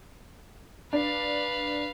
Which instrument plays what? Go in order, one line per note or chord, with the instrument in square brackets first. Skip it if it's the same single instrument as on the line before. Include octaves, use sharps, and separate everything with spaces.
[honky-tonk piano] D4 [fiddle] B4 F5